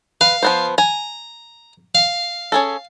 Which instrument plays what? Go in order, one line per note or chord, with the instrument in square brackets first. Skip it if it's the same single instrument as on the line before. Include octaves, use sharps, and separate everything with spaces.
[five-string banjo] B4 [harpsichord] F5
[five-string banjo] F3 B3 C5
[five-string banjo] G#5 [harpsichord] A#5
[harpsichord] F5
[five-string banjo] C#4 G#4 A4